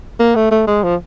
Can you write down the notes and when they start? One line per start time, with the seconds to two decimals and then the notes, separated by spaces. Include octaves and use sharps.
0.19 A#3
0.35 A3
0.51 A3
0.67 G#3
0.83 F3